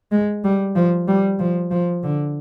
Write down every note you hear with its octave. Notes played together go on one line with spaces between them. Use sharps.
G#3
G3
F3
G3
F3
F3
D3